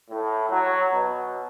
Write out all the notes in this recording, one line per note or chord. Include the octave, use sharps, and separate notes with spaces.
A2
F#3
B2